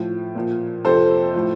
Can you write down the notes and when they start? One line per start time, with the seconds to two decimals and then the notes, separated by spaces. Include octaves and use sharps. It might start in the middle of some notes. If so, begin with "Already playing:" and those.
Already playing: A2 F3
0.35 A#2 F3
0.85 F2 C3 F3 A4 C5
1.34 A2 F3